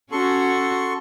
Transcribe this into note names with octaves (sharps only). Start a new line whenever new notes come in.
C#4 F#4 A4 C6 C#6